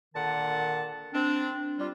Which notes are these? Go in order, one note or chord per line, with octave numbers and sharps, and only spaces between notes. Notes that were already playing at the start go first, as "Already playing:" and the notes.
A#2 D3 D#3 F#5 A5
C4 D4
G3 F4